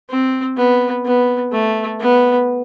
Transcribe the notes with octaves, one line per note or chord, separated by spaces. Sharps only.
C4
B3
B3
A3
B3